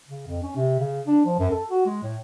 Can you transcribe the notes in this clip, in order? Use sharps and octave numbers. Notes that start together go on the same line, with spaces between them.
C#3
F2
C#4
C3
C#3
D4
F3
F#2
A4
F#4
G#3
A2